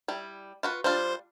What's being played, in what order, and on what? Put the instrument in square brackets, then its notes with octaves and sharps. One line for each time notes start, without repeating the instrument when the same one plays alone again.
[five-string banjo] G3 E4
F4 F#4 B4
[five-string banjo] G3 D4 F4 [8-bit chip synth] C5